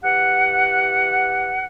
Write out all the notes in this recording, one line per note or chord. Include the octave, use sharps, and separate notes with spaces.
E3 G4 F#5